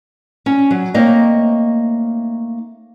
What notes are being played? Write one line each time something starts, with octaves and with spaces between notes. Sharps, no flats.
C#4
F#3
A3 A#3 C4 D#4 C#5 D#5